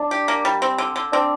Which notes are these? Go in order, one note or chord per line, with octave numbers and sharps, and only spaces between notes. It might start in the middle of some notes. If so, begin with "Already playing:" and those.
Already playing: D4
G4
A#3
G3
C4
D3
D3
C4 D4